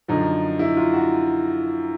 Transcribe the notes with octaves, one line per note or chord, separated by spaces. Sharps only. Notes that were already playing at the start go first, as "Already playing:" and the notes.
F#2 D3 F3 D#4
E4
F4
F#4